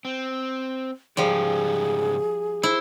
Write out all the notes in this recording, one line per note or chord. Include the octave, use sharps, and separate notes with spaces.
C4
G#2 C#3 F3 G3 G4 G#4
E4 C5